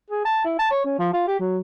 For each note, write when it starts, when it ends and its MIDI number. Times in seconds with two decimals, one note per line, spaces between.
0.10 0.22 68
0.25 0.42 81
0.45 0.56 64
0.59 0.66 81
0.71 0.81 73
0.85 0.98 61
0.99 1.11 53
1.13 1.23 65
1.27 1.39 67
1.40 1.60 54